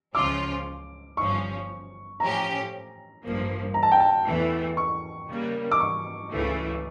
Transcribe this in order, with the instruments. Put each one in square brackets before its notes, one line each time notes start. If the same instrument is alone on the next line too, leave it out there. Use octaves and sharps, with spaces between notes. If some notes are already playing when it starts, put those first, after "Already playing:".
[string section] C#2 C#3 F3 C#4 F4 [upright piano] D6
[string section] G1 G2 F3 C#4 [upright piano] C#6
[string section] A2 F3 C#4 G4 [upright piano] A#5
[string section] A1 G2 F3 A#3
[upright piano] A#5
A5
G5
A5
[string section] E2 E3 A3
[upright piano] C#6
[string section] C#3 G3 A#3
[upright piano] D6
C#6
[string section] C#2 C#3 E3 A3